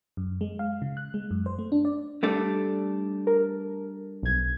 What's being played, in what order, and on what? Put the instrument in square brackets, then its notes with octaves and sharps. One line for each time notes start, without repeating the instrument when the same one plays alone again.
[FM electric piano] F#2
G#3
F5
C#3
F#6
G#3
F#2
C5
A3
D4
D5
[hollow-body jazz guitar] G3 A3 D4
[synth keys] A#4
B1 G#6